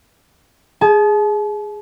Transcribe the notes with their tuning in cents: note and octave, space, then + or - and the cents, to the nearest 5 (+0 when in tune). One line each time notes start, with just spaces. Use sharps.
G#4 +0 A5 -40